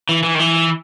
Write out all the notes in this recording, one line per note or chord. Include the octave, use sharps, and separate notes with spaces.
E3
E3
D#3
E3